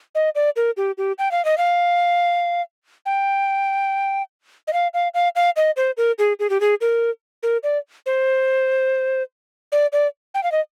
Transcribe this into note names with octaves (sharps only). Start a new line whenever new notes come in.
D#5
D5
A#4
G4
G4
G5
F5
D#5
F5
G5
D#5
F5
F5
F5
F5
D#5
C5
A#4
G#4
G#4
G4
G#4
A#4
A#4
D5
C5
D5
D5
G5
F5
D#5